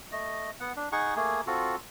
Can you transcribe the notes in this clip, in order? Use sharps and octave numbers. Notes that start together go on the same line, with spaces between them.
A3 D#5
B3 F#5
D4
D#4 G#4 F#5 C#6
A3 A#3 G#4
C4 F4 F#4 A4